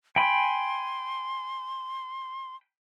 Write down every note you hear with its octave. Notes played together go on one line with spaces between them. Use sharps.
G5 G#5 B5 C6